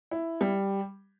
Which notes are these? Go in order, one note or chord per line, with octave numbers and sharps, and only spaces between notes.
E4
G3